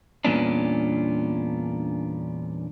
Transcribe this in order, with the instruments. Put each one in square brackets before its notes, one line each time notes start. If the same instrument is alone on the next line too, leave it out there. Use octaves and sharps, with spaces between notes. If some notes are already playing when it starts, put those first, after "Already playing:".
[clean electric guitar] E2 G2 A#2 B3 C#4 D4